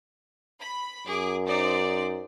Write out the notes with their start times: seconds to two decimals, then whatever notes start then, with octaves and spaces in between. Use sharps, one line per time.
0.59 B5
1.07 F#2 G#4 D6
1.46 D#4 C5 D5